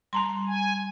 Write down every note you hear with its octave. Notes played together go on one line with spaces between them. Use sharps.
G3 A5 A#5 C6
G#5